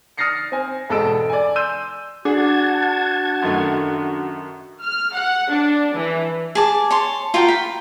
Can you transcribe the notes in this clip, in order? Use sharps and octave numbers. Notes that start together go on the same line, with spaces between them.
D#6 F6 A6 A#6 C7 C#7
C4 G#5
E1 G#2 A4 D#5 E6 D7
D5 G#5
C6 E6 G6 D#7
D4 F#4 G#4 F#5 A5 G#6
F#2 D#3 A3
F6
F#5
D4
E3
G#4 A5 D6
C#5 A5 C6
F4 F#4 A#4 G5
B5